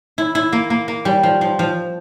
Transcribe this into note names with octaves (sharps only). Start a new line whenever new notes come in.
E4
E4
A#3
A#3
A#3
G3
F3
F3
F3